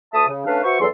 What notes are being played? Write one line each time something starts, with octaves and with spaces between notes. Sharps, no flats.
D2 A3 E5 A5 D#6
C#3
A3 C#4 D4 B4 E5 F5
F#4 B4 C5 E5 C#6
E2 F#3 A4 C6